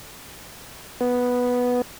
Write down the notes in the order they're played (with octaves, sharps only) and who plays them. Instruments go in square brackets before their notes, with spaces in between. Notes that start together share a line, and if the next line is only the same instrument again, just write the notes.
[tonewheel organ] B3